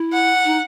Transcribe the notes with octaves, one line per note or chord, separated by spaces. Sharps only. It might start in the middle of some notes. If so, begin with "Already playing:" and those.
Already playing: E4
F#5
D#4